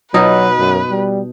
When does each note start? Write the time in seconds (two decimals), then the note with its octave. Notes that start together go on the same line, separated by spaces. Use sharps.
0.14 B2 F#3 D#4 B4
0.59 F#2
0.90 G3